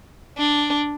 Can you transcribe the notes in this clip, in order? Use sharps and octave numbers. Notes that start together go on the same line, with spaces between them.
D4